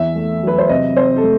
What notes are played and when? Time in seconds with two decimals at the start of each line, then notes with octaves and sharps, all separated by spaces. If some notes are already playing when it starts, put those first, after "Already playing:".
Already playing: E2 E5
0.16 A3
0.43 F#3 B4
0.58 C5
0.69 C3 D#5
0.96 C3 C5
1.17 A4
1.23 A3